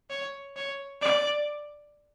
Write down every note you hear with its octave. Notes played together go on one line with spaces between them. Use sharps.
C#5
C#5
D5